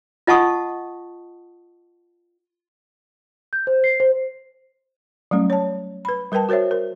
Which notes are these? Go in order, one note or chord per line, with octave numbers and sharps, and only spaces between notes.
F4 D#5 F#5 A5 C#6 D#6
G6
C5
C7
C5
F#3 G3 A3 C#4
C#5 A5
B4 B5
G3 A#4 B4 G5 A5
F#4 A#4 C5 C#5 E5
A#4